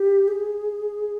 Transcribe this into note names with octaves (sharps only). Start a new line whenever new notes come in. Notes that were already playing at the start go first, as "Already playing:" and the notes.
Already playing: G4
G#4